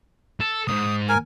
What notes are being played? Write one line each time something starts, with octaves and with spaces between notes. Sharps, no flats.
A4
C#2 G#2 D#6
A#4 G#5